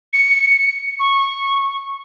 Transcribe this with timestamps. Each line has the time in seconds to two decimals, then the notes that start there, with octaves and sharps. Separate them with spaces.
0.13 C#7
0.99 C#6